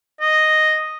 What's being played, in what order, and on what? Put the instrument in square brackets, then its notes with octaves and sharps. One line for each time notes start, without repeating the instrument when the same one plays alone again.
[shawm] D#5